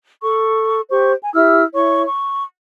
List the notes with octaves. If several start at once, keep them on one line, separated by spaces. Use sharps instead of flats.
A4 C#6
G4 C5 C#6
G#5
E4 G4 E6 F6
E4 C#5 C#6
C#6